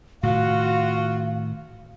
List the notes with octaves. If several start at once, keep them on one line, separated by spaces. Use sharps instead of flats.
A2 C3 D#3 F4 F#4 F5